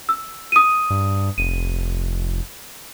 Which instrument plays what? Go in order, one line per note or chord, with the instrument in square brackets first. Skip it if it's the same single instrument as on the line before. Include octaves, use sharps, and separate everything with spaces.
[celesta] E6
D#6 D#7
[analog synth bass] G2
[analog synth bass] F1 [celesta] D#7